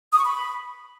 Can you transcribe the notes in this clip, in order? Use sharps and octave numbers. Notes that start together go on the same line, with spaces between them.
D#6
C#6
B5